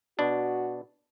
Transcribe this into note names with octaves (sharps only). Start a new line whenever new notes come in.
B2 D4 F#4